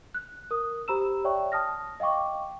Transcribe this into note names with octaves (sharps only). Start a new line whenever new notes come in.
F#6
A#4 D#6
G4 C5 A#5 B5 E6 E7
C#5 D5 E5 G5 C#6
A5 D#6 F6 A#6
D#5 F5 G5 C#6 D6